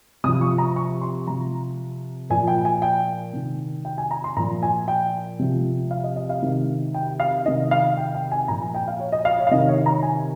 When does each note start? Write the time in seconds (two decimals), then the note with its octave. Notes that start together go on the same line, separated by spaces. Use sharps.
0.24 C3 D#6
0.28 F3
0.41 C#6
0.58 A#5
0.76 C#6
1.01 C6
1.27 C3 F3 A#5
2.30 A#2 F3 G#5
2.47 G5
2.65 G#5
2.82 G5
3.33 C3 D#3
3.85 G5
3.98 G#5
4.11 A#5
4.24 C6
4.36 A#2 F3 A#5
4.63 G#5
4.88 G5
5.39 C3 F3
5.91 F5
6.04 D#5
6.16 D#5
6.29 F5
6.42 C3 D#3
6.94 G5
7.20 F5
7.46 C3 D#3 D#5
7.71 F5
7.97 G5
8.15 G5
8.32 G#5
8.48 A#2 F3 A#5
8.62 G#5
8.75 G5
8.88 F5
9.00 C#5
9.12 D#5
9.25 F5
9.39 C#5
9.47 F5
9.51 C3 D#3 D#5
9.68 C#5
9.86 A#5
10.02 G#5